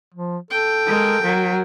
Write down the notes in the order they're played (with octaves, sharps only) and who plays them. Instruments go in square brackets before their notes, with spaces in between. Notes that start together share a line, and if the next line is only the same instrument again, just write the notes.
[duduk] F3
[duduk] A4 [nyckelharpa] G5
[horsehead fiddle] G#3 A#4
F#3 A#4